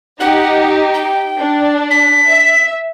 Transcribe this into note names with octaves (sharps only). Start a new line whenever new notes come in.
D#4 G4 F#5
G5
D4
B6
E5